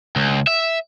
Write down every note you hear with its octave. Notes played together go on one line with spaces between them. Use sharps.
C#2
E5